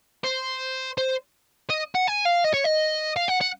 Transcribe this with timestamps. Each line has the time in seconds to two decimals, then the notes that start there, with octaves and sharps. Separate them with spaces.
0.24 C5
0.98 C5
1.70 D#5
1.95 F#5
2.07 G#5
2.25 F5
2.44 D#5
2.54 C#5
2.64 D#5
3.17 F5
3.28 F#5
3.41 F#5